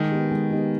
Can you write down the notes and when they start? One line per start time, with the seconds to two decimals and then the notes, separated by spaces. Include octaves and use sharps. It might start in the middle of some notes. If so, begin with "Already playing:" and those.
Already playing: D#3 G#3
0.12 B3 D#4 G4
0.31 G#3
0.50 B3 D#4 G4